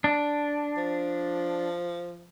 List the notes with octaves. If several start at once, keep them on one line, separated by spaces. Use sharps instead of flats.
D4
F3